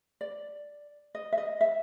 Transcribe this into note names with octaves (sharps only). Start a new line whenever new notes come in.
D5
D#5
E5
D#5
E5